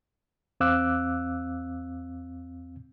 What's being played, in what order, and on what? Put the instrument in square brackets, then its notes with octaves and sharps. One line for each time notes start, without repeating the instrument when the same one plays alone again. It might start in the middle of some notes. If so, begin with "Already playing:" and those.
[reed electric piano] E2 C4 F5 D6 E6 F#6